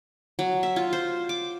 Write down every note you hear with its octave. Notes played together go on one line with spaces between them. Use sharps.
F#3
E5
F4
C5
D6